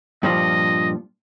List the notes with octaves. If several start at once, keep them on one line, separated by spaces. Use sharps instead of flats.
G2 A#2 F3 D#5